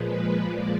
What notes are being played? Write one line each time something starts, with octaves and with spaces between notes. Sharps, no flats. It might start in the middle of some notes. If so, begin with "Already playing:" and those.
Already playing: A#2 F3 G#3 B4
D5